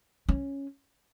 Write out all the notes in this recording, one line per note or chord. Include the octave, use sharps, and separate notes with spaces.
C#4